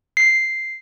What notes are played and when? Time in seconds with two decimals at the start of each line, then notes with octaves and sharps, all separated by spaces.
0.17 C7